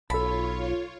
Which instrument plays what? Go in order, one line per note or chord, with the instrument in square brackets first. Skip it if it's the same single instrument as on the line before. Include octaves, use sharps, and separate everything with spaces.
[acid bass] B1 [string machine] F4 C#5 [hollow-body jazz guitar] A4 A5 [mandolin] B5